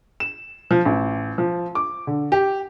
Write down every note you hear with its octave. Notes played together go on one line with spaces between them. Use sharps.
E7
F3
A1
F3
D6
D3
G4